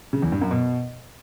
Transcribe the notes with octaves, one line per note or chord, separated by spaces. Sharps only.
C#3
E2
G2
F#2
B2